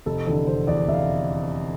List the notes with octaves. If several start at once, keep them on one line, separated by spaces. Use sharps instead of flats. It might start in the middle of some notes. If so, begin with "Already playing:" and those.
F1 A4
E2 D3 A4
F1 C5
E2 D3 D5
F1 E5
F5
E5